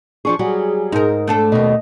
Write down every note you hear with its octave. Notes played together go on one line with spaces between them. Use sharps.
F3 D4 G#4 C#6
F#3 G3 F#4 G#4
G#2 D#4 A#4
A3 D4 A4
D#2 B2 D#5